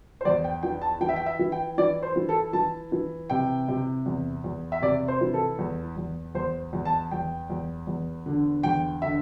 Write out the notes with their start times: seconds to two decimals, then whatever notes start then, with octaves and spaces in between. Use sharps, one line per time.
0.21 C5
0.25 E2 D5
0.44 G5
0.63 E3 G5
0.82 A5
1.01 E3 G5
1.09 E5
1.16 G5
1.26 E5
1.39 E3
1.52 G5
1.78 E3 D5
2.02 C5
2.16 E3
2.29 A4
2.53 E3 A5
2.92 E3
3.30 C3 G5
3.68 C3
4.06 E2
4.44 E2
4.72 E5
4.82 C3 D5
5.08 C5
5.21 E3
5.34 A4
5.59 E2
5.97 E2
6.35 E2 C5
6.73 E2
6.85 A5
7.11 E2 G5
7.50 E2
7.87 E2
8.26 D3
8.63 E2 G5
9.02 D3 E5